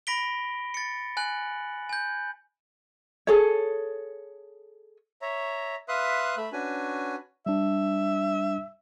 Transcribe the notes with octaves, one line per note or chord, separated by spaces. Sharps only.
B5 A#6 B6 D7 G7
A6 C#7
G#5 F#6 F#7
G#5 G6
G#4 A4 C#5
C#5 E5 A#5
B4 E5 F5 C6 D#6 F#6
A3 E5 B5
C#4 D4 F#4 B4 G#5
G3 D4 E5